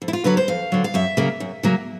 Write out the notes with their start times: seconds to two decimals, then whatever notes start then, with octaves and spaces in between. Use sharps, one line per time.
0.02 F2
0.08 E4
0.13 F4
0.24 D3 F#3 B4
0.37 C5
0.48 F2 F5
0.72 D3 F#3
0.84 F5
0.94 F#2 E5
1.17 C#3 F#3 A#3
1.40 F#2
1.63 C#3 F#3 A#3